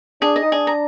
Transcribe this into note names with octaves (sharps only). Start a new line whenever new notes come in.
D4 G#4
D#5
D#4
D4 G#4
A#5